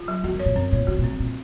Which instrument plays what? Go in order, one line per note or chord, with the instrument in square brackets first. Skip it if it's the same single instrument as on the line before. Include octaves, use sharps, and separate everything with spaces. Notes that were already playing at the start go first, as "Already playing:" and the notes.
Already playing: [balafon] F4
F#3
[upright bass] F2 [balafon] F#4
[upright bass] F#2
[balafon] C#5
[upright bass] A#2
[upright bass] F#2 [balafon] C4
[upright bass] A#2 [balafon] C#5
[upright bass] C#3 [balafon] F#4
[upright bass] A#2
[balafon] C4
[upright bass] C3
[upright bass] A#2 [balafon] C4